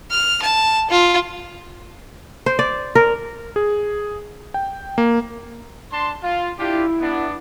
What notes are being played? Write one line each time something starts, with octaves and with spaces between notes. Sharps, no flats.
F6
A5
F4
C5
D5
A#4
G#4
G5
A#3
D4 A5 C6
F4
D4 E4 F4 G4
B3 D4